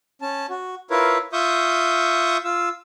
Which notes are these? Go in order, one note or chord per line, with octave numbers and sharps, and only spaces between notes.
C#4 A5
F#4
E4 F4 A#4 B4 C#5
F4 E5 C#6 D#6 G6
F4 E6